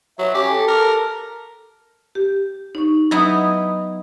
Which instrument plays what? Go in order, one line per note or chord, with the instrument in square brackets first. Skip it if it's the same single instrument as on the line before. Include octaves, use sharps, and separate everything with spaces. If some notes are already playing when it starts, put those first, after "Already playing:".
[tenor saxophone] F#3 [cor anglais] E5
[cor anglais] C#4 [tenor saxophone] G4
[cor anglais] A4
[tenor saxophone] A#4
[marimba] G4
D#4 C#6
[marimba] F#3 [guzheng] B3 D#4 E4